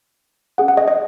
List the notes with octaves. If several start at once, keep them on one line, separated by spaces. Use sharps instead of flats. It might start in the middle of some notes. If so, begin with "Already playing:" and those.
C#4 G#4 F#5
F#5
D#5
D#5